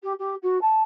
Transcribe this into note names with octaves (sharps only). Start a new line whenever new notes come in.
G4
G4
F#4
A5